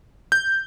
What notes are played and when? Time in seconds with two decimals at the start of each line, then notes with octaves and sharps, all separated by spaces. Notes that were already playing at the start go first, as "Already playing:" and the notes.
0.32 G6